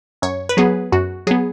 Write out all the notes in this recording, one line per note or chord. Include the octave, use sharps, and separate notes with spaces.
F#2 C#5
B4
F#3 B3 G#4
F#2 F#4
F#3 B3 G#4